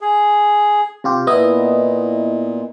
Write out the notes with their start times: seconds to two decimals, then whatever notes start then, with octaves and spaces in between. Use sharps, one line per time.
0.01 G#4
1.04 C3 F4 G4
1.27 A#2 B3 E4 D#5